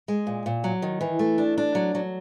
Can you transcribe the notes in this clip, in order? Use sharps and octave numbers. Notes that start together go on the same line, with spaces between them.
G#3
A#2
A#2
F#3
D#3
E3
A3
D4
D4
F#3
F#3